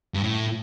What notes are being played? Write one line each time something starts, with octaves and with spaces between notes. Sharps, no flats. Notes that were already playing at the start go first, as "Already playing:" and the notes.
G2
A2